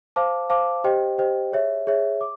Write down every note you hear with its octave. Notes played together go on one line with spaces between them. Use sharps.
C5 F5 A5 D6
C5 F5 A5 D6
G4 C5 D#5 G5
G4 C5 D#5 G5
G#4 C#5 E5
G#4 C#5 E5
D6